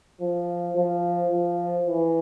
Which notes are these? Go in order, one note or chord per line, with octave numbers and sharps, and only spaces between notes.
F3
F3
F3
E3